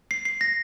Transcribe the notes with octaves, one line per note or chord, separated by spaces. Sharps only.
C7
C7
A#6